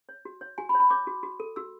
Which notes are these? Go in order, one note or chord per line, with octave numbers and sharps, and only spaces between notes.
C#5
F#4
C#5
F#4 G#5
B5
C#5
B5
C#5 D6
F#4
F#4
A4
F#4 E6